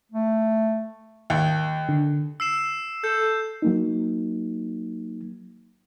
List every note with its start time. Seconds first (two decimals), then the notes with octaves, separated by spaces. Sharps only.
0.12 A3
1.30 D#2
1.89 D3
2.40 E6 C7 E7
3.04 A4 G6
3.62 F#3 A#3 D#4